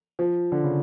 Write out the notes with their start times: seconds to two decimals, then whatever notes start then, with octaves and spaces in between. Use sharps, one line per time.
0.19 F3
0.52 D3
0.64 C#3